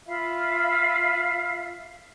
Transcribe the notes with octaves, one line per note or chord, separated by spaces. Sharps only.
F4 E5 F5 B5